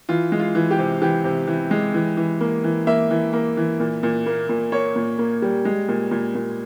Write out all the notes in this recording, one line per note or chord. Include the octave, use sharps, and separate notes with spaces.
E3 F4
G#3
F4
E3
G4
C3
E3 G4
C3
E3
G#3
E3
E3
A#3
E3
A#3 E5
E3
A#3
E3
A#2
A#2
A#3
A#2
A#3 C#5
A#2
A#3
G3
G#3
A#2
A#2
A#2